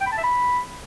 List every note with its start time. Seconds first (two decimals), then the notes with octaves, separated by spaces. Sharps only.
0.01 G5
0.07 B5
0.12 A5
0.18 E5
0.24 B5